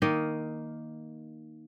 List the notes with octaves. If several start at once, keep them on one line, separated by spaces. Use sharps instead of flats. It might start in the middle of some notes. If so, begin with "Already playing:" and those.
D#3 A#3 D#5